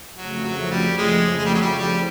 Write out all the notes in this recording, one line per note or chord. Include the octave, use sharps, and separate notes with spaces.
F2 C#3 F3 F#3 A3
F#3
G3
G#3
G#3
G3
F#3
G3
G3 C4 E4